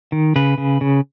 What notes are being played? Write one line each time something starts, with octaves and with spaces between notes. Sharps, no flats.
D#3
C#3 B4
C#3
C#3